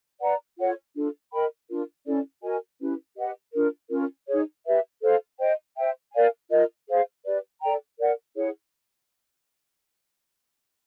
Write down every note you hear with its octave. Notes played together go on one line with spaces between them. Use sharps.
B4 D5 F#5 A#5
F4 A4 C#5 F#5
D4 F4 A4
A#4 D#5 G5 B5
D4 F4 A#4
C#4 E4 A4 D5
F#4 A#4 D#5 G#5
C#4 E4 G4 B4
G4 B4 D#5 F#5
D4 F4 A#4
C#4 F4 A#4
D#4 G#4 C#5
G4 B4 E5
A4 C5 F5
C5 D#5 G5
C5 E5 G5
A#4 D5 F5 G#5
F4 A#4 D#5
G#4 C5 F5
G4 B4 D5
A4 D5 G5 A#5
A#4 D5 F#5
E4 G#4 C#5 F#5